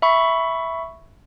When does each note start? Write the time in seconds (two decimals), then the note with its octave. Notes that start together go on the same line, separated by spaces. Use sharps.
0.02 E5 B5 C#6